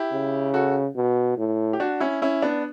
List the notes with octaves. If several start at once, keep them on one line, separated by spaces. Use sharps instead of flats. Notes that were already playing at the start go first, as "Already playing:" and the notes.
Already playing: E4 G4
C#3
F#4 A4
B2
A2
G4
D4 F#4
C#4 E4
C#4 E4
B3 D4